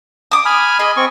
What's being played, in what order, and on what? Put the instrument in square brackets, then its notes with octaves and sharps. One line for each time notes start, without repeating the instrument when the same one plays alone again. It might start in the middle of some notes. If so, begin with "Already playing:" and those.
[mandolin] D6 D#6
[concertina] G#5 B5 F6
[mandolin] G#4 [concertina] D#5 B5
[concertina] C4 C#6